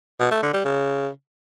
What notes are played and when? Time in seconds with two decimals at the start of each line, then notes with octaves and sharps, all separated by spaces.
0.20 B2
0.31 A3
0.43 D3
0.54 G3
0.65 C#3